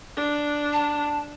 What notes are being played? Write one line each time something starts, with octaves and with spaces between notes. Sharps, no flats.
D4
A5